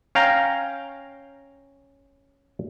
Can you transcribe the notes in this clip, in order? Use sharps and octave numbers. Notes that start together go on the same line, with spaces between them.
C#4 F5 G5 A#5